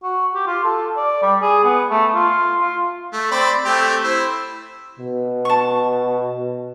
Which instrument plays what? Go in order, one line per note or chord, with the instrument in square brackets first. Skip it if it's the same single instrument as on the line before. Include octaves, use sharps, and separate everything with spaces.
[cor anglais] F#4
G4
F4
A4
D5
G3
G#4
B3
A3
F4
F4
[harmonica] A3
C4 D5 B5
A3 C4 G4
E4 C5
[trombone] B2
[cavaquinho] A5 C#6